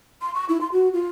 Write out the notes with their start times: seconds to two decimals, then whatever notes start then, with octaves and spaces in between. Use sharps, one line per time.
0.22 C6
0.35 C#6
0.49 E4
0.61 C6
0.72 F#4
0.94 F4